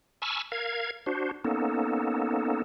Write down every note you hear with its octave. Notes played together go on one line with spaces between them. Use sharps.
G#5 A5 B5 C#6 E6 F6
A#4 F5 G#6
D4 F#4 C5
A#3 B3 C#4 D#4 A4